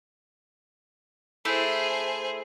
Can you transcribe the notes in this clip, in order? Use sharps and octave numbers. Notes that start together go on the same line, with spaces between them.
A3 E4 G#4 C5 E5